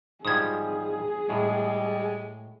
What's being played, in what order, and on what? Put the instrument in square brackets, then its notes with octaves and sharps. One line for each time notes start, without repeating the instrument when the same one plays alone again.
[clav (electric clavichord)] G#2 F3 G3 [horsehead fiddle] G#4 [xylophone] D#6 G#6
[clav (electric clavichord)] A2 [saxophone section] G3 G#3